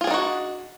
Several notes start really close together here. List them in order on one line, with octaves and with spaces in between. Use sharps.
F4 G#4 D4 D#4 F#4